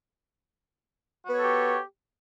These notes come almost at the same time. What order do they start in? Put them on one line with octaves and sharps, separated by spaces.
F#4 B3 C#5 A4 G4